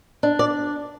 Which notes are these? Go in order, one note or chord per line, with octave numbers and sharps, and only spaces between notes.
D4
D5